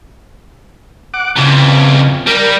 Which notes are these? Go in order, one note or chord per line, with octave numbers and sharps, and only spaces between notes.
F#5 D6
F2 C#3 E3
G3 A#4